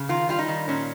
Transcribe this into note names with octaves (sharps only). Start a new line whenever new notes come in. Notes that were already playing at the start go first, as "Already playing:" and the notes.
Already playing: C#3
D#3 F4
G3 F4
D#4
D#3
A#2 C#4